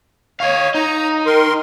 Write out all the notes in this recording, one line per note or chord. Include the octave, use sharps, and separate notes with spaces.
C#5 D#5 F5
D#4 A#5
D#3 A#4 C6